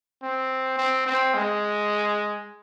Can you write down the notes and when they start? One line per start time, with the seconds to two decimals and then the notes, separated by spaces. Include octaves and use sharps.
0.23 C4
0.78 C4
1.07 C4
1.35 G#3